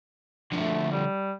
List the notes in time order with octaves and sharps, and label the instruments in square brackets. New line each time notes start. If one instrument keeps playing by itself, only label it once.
[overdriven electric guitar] D3 F3 [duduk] A3
[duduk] G3